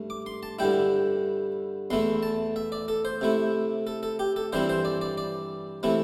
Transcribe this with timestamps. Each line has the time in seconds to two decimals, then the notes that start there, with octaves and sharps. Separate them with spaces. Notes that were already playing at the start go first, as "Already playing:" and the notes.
Already playing: G2 A3
0.10 D6
0.26 C6
0.43 A5
0.59 G2 D3 G3 E4 G5
1.90 E2 E3 A3 E4 C6
2.23 A5
2.56 E5
2.72 D5
2.88 A4
3.05 C5
3.21 C3 A3 E4
3.87 A4
4.03 A4
4.19 G4
4.36 A4
4.53 G2 E3 G3 C4 E4 C5
4.69 C5
4.85 D5
5.01 D5
5.18 D5
5.83 C3 E3 A3 E4